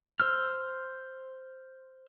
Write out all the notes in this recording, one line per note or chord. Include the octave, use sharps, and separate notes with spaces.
C5 E6 F6